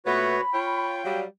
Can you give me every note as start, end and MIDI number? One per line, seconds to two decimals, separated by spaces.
0.06 0.37 46
0.06 0.37 57
0.06 0.37 59
0.06 0.41 66
0.06 0.41 71
0.06 0.41 73
0.06 1.00 83
0.53 1.02 65
0.53 1.02 73
0.53 1.20 79
1.04 1.25 54
1.04 1.25 55
1.04 1.24 77